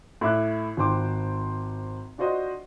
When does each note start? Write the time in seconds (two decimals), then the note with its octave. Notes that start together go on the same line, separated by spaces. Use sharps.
0.21 A2 E5 D6 F#6
0.77 G#1 D#3 F4 C5 G5 D6
2.18 D4 F4 F#4 C5 D#5